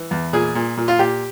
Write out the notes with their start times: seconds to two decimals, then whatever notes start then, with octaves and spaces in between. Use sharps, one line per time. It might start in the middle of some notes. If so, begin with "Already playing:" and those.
Already playing: E3
0.11 E2
0.33 A#2 G#4
0.55 A#2
0.77 A#2
0.88 F4
0.99 A#2 G4